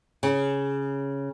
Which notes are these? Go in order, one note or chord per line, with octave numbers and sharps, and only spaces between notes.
C#3